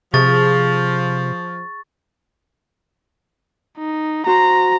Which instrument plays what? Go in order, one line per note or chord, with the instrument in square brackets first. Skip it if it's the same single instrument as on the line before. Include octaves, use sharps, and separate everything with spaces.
[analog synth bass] C3 [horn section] F3 [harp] G#4 D#7 [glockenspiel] C#6 A6
[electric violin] D#4
[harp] F#4 C5 [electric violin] A#5